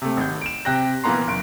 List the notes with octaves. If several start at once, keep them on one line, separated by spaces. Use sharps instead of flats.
C3 A3
G#1 G6
D7 E7
C3 G5 F#6 A#6
A#2 E3 A#3 B3 A#5 C6
F#1 D7